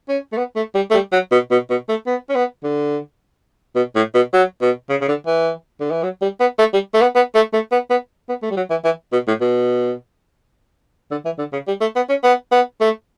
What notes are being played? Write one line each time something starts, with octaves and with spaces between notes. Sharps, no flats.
C#4
A3
B3
A3
G3
A3
G3
F#3
B2
B2
B2
A3
B3
C#4
B3
D3
B2
A2
B2
F#3
B2
C#3
C#3
D3
E3
D3
E3
F#3
G3
B3
A3
G3
A3
B3
B3
A3
A3
B3
B3
B3
A3
G3
F#3
E3
E3
B2
A2
B2
D3
E3
D3
C#3
G3
A3
B3
C#4
B3
B3
A3